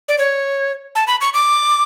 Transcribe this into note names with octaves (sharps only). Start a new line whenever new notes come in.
D5
C#5
A5
B5
C#6
D6